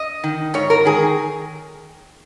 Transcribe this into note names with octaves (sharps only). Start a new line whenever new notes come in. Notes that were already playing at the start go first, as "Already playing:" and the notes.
Already playing: D#5
D#3
G#2 C#5
A#4
D#3 G#4